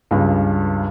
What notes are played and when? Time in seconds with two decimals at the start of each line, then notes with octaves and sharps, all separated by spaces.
0.11 C#2 G2